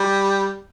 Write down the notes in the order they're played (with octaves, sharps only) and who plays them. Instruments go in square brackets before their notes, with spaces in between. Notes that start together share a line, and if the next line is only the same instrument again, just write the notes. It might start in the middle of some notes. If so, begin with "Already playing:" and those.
Already playing: [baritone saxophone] G3